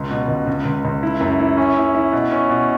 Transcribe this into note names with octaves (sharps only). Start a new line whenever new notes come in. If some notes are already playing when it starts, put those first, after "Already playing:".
Already playing: C#2
B2
C#2
C#2
C#2
C#2
E4
F#2
E4
C#4
E4
E4
B2
C#4
B2